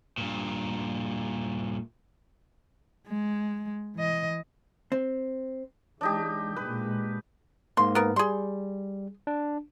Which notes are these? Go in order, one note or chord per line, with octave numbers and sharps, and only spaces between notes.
G2 A#2
G#3
E3 D#5
C4
E3 G#3 D4 D#4 G4
A#2 G#3 B4
G#2 A#3 C6
B3 A#4
G3 G#4 C6
D4